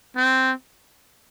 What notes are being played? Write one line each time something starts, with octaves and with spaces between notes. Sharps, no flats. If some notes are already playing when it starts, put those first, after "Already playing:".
C4